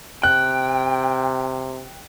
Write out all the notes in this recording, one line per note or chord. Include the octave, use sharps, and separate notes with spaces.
C3 G5 F#6